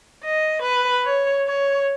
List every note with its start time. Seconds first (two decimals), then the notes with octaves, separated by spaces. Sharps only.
0.23 D#5
0.63 B4
1.05 C#5
1.47 C#5